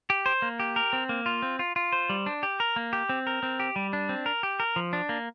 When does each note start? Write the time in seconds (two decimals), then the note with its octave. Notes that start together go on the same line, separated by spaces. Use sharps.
0.10 G4
0.26 C5
0.42 A#3
0.60 G4
0.76 A#4
0.93 C4
1.09 A#3
1.26 F4
1.42 C4
1.59 F4
1.76 F4
1.93 C5
2.10 G3
2.26 D4
2.43 G4
2.60 A#4
2.76 A#3
2.93 G4
3.09 C4
3.27 A#4
3.43 C4
3.60 G4
3.76 G3
3.93 D4
4.09 C4
4.26 A#4
4.43 G4
4.60 A#4
4.76 F3
4.93 D4
5.09 A#3